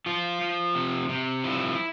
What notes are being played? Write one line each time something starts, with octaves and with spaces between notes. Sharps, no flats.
F3 F4
F3
C3
C3
F3 E4